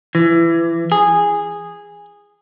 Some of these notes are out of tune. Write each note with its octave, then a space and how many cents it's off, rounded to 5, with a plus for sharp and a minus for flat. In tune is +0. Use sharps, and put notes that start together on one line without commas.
E3 +25
G#4 -10